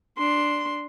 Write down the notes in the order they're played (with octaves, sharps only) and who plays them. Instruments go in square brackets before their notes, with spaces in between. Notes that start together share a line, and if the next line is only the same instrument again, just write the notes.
[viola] D4 C6